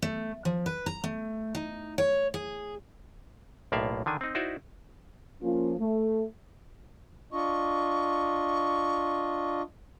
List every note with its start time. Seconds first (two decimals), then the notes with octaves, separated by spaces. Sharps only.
0.02 A3
0.45 F3
0.66 B4
0.86 A#5
1.04 A3
1.55 D#4
1.98 C#5
2.34 G#4
3.72 B1 A2 A#3 D5 E5 F5
4.06 D3 D#3 D4 G#5
4.21 C4 D#4
4.35 D#4 E4 F#4 C5 D5 E5
5.42 F3 A#3 C#4 F4
5.80 A3
7.32 D4 F4 D#5 C#6